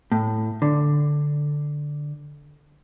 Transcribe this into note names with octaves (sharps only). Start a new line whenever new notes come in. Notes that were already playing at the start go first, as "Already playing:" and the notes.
A2
D3